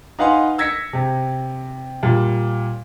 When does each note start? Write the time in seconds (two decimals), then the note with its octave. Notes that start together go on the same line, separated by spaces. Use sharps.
0.19 D#4 B4 F5 F#5 G#5 C6
0.58 E6 G#6 A#6 B6 C#7
0.93 C3
2.03 A#2 G3